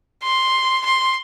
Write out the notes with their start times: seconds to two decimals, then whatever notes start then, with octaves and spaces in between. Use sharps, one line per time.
0.23 C6
0.86 C6